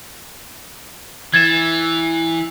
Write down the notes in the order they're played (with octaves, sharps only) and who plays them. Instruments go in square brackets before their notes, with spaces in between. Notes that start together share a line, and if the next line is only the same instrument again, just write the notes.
[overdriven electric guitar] E3 [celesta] G#6 A6 E7